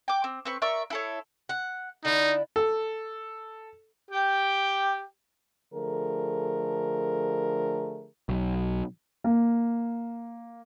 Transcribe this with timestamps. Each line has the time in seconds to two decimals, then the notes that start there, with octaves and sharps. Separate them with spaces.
0.08 G5 D6
0.24 C4
0.45 C4 B4 C#6
0.62 A#4 D5 E5 C#6
0.90 E4 A4 C#5
1.49 F#5
2.05 D3 D#4 E4
2.56 A4
4.11 G4 G5
5.73 D3 F3 A3 G#4 A#4
8.29 B1
9.24 A#3